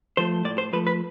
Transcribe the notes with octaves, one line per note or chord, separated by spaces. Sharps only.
F3 A3 C5
A2 D5
C5
F3 A3 B4
B4